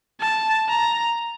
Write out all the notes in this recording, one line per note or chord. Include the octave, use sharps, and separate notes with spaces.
A5
A#5